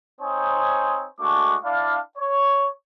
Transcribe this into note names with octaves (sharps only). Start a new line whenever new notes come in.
C4 D#4 C5 C#5 G#5 D#6
G#3 A3 D4 F#4 C#6 D6
D4 E4 D5 F5
C#5